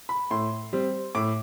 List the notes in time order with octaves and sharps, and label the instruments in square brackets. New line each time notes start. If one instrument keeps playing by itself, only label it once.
[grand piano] B5
A2 C6
G3 C4
A2 D6